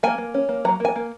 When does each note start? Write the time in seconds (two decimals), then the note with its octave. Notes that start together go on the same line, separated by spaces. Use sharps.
0.03 A#3 G#5
0.18 A#3
0.34 C#4
0.49 A#3
0.65 F#3 A#5
0.80 A#3 G#5
0.96 A#3